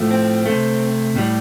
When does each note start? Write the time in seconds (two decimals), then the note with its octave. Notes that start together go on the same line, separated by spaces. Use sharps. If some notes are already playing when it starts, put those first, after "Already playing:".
Already playing: A2 F3 A3
0.11 C4
0.46 C3 A3
1.16 A2 G3